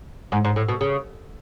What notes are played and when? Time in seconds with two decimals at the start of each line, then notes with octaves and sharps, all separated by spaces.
0.32 G#2
0.45 G#2
0.56 A2
0.69 B2
0.81 C#3